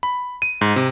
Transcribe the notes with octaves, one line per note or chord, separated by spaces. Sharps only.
B5
D#7
G#2
C3